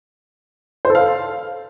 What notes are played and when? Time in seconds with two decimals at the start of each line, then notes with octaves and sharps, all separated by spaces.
0.85 C5
0.90 A4
0.95 F5